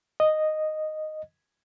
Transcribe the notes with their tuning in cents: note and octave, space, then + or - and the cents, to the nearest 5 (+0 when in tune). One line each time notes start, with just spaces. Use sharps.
D#5 -5